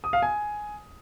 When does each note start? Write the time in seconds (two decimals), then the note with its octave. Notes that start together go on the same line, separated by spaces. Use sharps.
0.04 D#6
0.13 F5
0.22 G#5